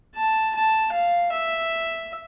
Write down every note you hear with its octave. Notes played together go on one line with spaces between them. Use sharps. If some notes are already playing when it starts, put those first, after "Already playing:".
A5
A5
F5
E5